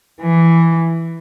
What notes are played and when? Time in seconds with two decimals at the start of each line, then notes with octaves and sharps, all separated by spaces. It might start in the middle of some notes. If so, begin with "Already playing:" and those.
0.21 E3